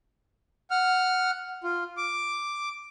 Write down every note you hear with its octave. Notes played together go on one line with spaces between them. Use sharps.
F#5 F6
F4
D6